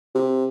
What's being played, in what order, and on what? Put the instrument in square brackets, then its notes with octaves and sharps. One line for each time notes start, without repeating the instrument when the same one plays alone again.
[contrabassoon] C3